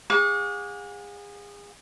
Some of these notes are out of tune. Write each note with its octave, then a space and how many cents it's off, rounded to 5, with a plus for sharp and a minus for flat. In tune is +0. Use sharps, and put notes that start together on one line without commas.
G#4 -30 F#5 -45 D6 -35